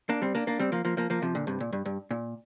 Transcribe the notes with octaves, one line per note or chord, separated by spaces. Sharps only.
A#3 D4
G3 C4
A#3 D4
A#3 D4
G3 C4
F3 A#3
F3 A#3
F3 A#3
F3 A#3
C3 F3
A#2 D3
G2 C3
A#2
G2
G2
A#2